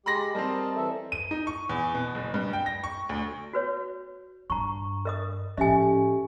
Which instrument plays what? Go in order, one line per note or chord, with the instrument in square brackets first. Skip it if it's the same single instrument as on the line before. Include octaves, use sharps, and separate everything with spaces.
[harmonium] G#3 G4 [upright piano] B5 C6 A#6
[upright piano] G3 C4 [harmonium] A#4 D#5 A5
[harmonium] E3 A4 E5
[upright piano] D#7
D#4
C#6
E2
B2
F#1
G2
G5
A#6
C#6
D2
[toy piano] F#4 B4 C#5
[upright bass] G2 [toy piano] A#5 C#6
[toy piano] A#4 D#5 D#6
[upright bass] A2 F3 [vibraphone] C#4 G4 A4 [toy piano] D#5 E5 G#5